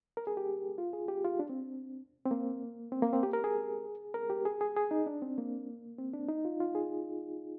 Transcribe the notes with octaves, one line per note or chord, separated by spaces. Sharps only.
A#4
G#4
G4
F4
G#4
G4
F4
D4
C4
C4
A#3
C4
A#3
C4
G4
A#4
G#4
A#4
G4
G#4
G#4
G#4
D#4
D4
C4
A#3
C4
D4
D#4
F4
F4
G#4